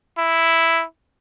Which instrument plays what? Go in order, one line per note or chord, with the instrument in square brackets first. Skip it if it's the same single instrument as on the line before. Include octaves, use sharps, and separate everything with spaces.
[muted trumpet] E4